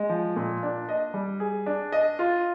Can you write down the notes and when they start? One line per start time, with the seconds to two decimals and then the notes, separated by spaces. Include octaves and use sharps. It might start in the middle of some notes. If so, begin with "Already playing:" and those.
Already playing: G#3
0.09 F3
0.36 A#2
0.63 D4
0.89 D#5
1.14 G3
1.40 G#4
1.66 D4
1.92 D#5
2.19 F4